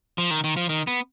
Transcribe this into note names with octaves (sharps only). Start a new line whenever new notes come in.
F3
D#3
D#3
F3
D#3
B3